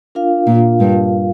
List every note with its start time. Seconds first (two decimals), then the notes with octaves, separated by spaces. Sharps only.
0.15 D4 F4 A#4 F5
0.47 A#2
0.80 G2